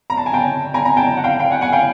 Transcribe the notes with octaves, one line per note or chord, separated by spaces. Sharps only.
A#5
A5
G#5
G5 A5
G#5 A#5
G#5 A#5
G5 A5
F#5
F5 G5
F5 G5
F#5 G#5
F#5 G#5
F5 G5